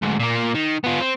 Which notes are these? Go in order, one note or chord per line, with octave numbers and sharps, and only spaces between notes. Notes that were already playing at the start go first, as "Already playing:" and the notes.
D2 G#2
A#2 A#3
D#3
B3 F4
C4